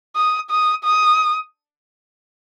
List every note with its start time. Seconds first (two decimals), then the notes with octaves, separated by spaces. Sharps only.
0.16 D#6
0.51 D#6
0.85 D#6